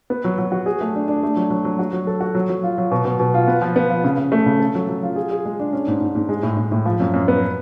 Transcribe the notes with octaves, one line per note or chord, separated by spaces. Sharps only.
B3
F#3
F#3
F#4
G#4
A3
D4
D4
A3
F#3
F#3
F#3
F#4
F#3
A4
F#4
F#3
F#3
F4
F#3
B2
B2
B2
F4
B3
F3
B3
F3
C#3
C#3
A3
C#3
A4
F#3
F#3
F4
G#4
G#4
G#3
D4
C#4
G#2
G#2
G#2
G#3
A2
A2
A2
F3
F#2
F#2
B3